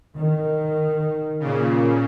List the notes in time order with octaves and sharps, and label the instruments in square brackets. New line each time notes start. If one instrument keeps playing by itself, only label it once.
[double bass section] D#3
[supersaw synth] A#2 C#3